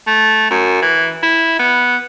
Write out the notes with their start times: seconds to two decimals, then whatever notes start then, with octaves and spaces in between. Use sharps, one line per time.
0.07 A3
0.50 F#2
0.82 E3
1.23 E4
1.59 B3